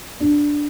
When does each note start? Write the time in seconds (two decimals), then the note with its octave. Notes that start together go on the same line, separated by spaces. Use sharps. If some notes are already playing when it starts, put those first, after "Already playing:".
0.20 D4